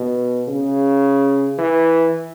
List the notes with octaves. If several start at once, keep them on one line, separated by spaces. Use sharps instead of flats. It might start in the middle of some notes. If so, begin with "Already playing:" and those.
Already playing: B2
C#3
E3